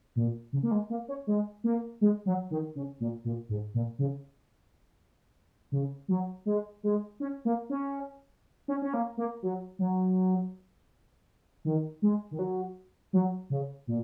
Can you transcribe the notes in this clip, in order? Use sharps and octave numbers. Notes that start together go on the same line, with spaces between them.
A#2
C#3
A#3
G#3
A#3
C#4
G#3
A#3
G#3
F#3
D#3
C#3
A#2
A#2
G#2
A#2
C#3
C#3
F#3
G#3
G#3
C#4
A#3
C#4
C#4
C#4
A#3
A#3
F#3
F#3
D#3
G#3
D#3
F#3
F#3
C#3
A#2